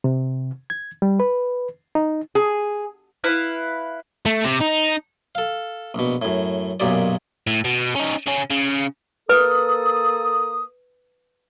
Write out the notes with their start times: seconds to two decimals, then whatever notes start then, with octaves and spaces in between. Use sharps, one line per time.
0.04 C3
0.70 G#6
1.02 G3
1.20 B4
1.95 D#4
2.35 G#4
3.24 E4 B4 F5
4.26 A3
4.45 C3
4.61 D#4
5.35 A4 F5
5.94 A#1 B2
6.22 F#2 A2
6.80 B1 F#2 A#2 G4 G#4 D5
7.47 A2
7.65 B2
7.96 C#4 D#4
8.26 C#3 C#4
8.50 C#3
9.29 A#3 A4 B4 D#6